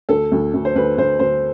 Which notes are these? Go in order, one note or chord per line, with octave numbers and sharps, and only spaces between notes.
D2 A4
D2
D2
C5
D2 B4
D2 C5
D2 C5